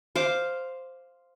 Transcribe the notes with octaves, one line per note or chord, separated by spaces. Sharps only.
C5 F5 D6